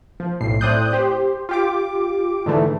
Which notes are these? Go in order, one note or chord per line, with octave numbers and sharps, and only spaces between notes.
F3
B1 A2 C7
A2 C4 D5 D#6 F#6 G6
G4 C5
F4 G4 D6
G#2 D3 E3 A3